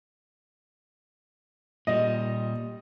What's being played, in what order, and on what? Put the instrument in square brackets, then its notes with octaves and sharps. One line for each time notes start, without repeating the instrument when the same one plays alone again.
[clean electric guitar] A#2 G3 [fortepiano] D#5